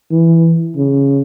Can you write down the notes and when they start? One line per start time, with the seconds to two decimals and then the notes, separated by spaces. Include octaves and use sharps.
0.11 E3
0.76 C#3